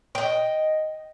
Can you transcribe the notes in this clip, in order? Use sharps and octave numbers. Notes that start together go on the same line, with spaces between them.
D#5 G5